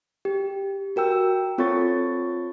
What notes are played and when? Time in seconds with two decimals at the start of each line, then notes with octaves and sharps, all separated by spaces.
0.25 G4
0.96 F#4 A#4 G5 E6
1.58 C4 F4 A4 C#5 C#6 A6